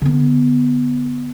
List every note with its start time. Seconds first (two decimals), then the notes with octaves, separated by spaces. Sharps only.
0.02 D3 B3